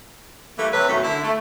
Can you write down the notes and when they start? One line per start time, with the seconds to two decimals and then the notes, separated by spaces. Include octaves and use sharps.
0.57 E3 G3 A3 A#3
0.73 C3 E3 A3 B4 C#5
0.88 F#2 B2 D#3 A3 C#4
1.03 D3 E4
1.24 A3